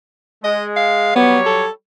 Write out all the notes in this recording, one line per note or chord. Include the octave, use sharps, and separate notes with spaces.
G#3 D#5
F5
F#3 G3 B3 C#5
A4